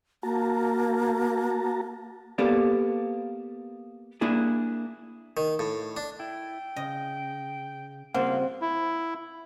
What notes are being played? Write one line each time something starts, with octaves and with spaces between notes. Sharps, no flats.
A#3 F#4 A5 A#5
A#3 B3 G4 A4 D5
A#3 D4 E4 G#4
D#3
A2
D4
E4 G5
C#3 D#5
C#3 G3 A#3 C4 F4 F#5
E4